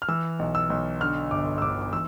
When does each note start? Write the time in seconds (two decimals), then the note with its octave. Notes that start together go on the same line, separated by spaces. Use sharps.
0.02 F6
0.08 E3 E6
0.39 B1
0.55 E6
0.70 B1
1.01 D3 F6
1.31 G1 D6
1.58 E6
1.62 G1 D6
1.81 D6
1.93 E3 E6